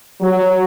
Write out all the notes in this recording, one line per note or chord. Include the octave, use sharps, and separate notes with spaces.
F#3